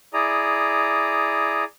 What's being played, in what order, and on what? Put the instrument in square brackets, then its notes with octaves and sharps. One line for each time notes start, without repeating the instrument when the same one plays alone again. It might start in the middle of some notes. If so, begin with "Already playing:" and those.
[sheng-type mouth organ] E4 G#4 D5 A#5 D#6